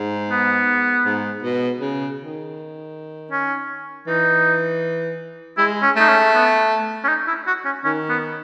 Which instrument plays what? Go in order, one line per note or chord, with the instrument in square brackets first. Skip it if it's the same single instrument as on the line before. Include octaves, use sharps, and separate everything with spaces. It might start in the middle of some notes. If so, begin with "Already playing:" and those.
Already playing: [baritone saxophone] G#2
[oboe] B3
[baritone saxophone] G#2
B2
C#3
D#3
[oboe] C#4
[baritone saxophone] E3 [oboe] D#4
[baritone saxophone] G#3 [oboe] E4
[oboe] C#4
[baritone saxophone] A3 [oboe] D#4
[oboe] C#4
B3
C#4
D#4
E4
F#4
C#4
[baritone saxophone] D#3 [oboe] C#4
[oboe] B3